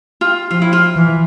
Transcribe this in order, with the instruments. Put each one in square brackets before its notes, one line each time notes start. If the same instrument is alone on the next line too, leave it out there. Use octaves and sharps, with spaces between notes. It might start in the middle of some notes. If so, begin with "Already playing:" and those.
[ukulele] F4
[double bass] F3 [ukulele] F4
[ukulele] E4
F4
[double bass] E3